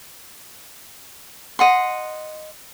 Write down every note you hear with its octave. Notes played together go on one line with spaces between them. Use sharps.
D#5 F#5 C6